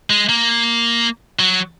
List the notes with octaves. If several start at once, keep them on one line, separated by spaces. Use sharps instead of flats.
G#3
A#3
F#3